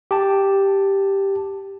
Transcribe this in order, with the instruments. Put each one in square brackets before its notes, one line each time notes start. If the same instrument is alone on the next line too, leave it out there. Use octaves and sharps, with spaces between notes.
[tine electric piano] G4 A5